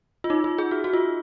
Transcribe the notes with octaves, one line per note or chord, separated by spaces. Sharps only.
F4
D#4
F4
G#4
F#4
F#4
F4